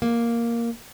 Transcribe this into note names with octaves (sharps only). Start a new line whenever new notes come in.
A#3